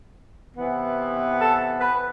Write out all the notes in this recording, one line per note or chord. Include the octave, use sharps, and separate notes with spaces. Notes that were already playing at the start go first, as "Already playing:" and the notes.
C3 E3 B3
A4
B4